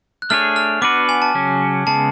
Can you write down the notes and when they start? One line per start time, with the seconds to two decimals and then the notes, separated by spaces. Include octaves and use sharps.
0.22 F#6
0.30 A3 D4 G#4 C#5 F6
0.56 F6
0.82 B3 D4 F#4 B4 D6
1.09 G#5
1.22 A5
1.35 C#3 F#3 C#4
1.87 C#3 G#3 B3 A5